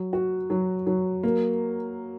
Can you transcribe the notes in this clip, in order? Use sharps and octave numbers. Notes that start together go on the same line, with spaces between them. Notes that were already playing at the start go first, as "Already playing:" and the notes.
Already playing: F#3
F#4
F#3
F#3
A#3